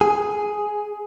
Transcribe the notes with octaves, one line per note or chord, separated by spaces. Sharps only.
G#4